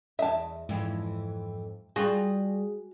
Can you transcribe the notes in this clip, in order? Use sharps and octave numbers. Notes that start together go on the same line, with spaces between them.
E2 D#5 E5 A5
F2 G#2 E3
G3 F4 F#4 G#4